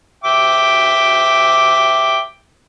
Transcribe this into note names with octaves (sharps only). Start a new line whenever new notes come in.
E5 G5 D6